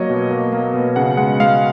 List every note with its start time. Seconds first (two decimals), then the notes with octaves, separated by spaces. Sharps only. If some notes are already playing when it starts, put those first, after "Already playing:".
Already playing: F#3 A#3 C#5 D#5
0.10 B2
0.31 A#3
0.52 A#3
0.74 B2
0.96 C#3 F#5
1.17 G#3 F#5
1.40 G#3 F5